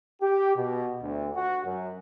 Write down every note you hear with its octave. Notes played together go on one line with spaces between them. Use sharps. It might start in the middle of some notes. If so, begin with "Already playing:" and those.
G4
B2
D2
F#4
F#2